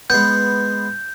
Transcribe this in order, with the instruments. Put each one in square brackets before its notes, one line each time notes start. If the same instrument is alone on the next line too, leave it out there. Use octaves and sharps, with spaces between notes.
[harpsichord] G#3 B3 [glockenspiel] G6